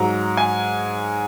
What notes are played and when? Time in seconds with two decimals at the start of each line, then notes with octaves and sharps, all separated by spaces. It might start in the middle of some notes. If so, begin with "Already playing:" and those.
Already playing: G#2 F#3 A#5
0.37 G#5